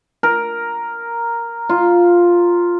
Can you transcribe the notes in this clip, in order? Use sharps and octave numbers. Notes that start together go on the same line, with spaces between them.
A#4
F4